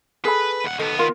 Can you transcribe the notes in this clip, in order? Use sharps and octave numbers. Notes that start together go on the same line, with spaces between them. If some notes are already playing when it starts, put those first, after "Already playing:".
G#4 A4 B4 B5
D#2 F#5
D#3 B3 A4
F4 A#4 F5